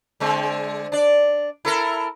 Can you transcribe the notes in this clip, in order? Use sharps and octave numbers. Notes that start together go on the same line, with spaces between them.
D3 G#3 C4
D4 D5
E4 A4 A#4